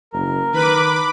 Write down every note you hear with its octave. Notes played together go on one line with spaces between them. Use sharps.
F#1 A#4
D#3 B4 B5 D6